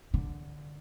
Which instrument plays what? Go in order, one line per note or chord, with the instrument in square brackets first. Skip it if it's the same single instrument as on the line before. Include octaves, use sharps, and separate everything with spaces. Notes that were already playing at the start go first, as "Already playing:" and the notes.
[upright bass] D3